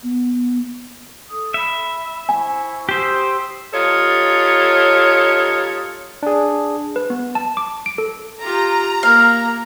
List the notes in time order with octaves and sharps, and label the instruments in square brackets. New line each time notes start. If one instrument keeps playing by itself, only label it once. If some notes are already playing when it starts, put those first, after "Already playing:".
[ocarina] B3
[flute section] A4 D#6
[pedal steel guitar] E5 [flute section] B5
[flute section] E4 C5 C#6 [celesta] G#5
[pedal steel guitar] G4 C5 [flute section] D#6 E6
[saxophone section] G3 D#4 F4 A4 C#5
[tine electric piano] D4 G#4
[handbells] B4
B3
A5
D6
D7
A4
[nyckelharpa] F4 G4 [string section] A#5
[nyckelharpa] A#3 [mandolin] F5